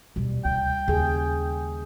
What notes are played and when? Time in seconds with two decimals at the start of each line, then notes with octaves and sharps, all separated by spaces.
0.16 D#1 B2 G3
0.45 D2 C3 G5
0.88 D#2 C#3 G#4